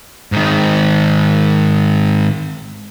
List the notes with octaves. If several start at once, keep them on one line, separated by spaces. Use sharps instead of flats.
G#2 D#3